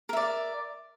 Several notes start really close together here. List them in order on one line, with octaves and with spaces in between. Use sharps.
A#4 E5 D5